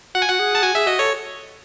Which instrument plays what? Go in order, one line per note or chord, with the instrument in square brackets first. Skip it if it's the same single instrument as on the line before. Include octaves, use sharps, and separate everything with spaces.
[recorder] F#4 [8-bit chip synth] F#5
[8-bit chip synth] G#5
[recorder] F#4 [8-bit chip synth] F#5
[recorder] G#4
[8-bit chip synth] A5
[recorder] F#4 [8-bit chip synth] G#5
[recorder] G#4 [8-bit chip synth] E5
[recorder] F#4 [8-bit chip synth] D#5
[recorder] A4 [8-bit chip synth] C#5